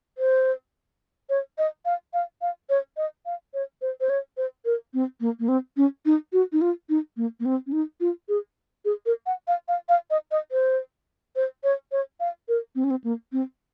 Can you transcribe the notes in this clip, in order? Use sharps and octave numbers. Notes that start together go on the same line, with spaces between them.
C5
C#5
D#5
F5
F5
F5
C#5
D#5
F5
C#5
C5
C5
C#5
C5
A#4
C4
A#3
A#3
C4
C#4
D#4
F#4
D#4
F4
D#4
A#3
A#3
C4
C#4
D#4
F4
G#4
G#4
A#4
F#5
F5
F5
F5
D#5
D#5
C5
C5
C#5
C#5
F5
A#4
C4
C#4
C4
A#3
C4